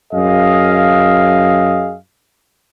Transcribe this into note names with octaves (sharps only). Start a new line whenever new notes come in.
F#2 G#4 D#5 F5